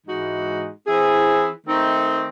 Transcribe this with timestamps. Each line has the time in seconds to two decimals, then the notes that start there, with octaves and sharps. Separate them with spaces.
0.06 G#2 E3 G#3 D#4 F#4
0.87 E3 C4 E4 G#4
1.67 D#3 A3 C4 D#4